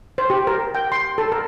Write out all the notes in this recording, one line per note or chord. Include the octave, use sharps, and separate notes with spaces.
C5
G4
A#4
G5
C6
A4
A#4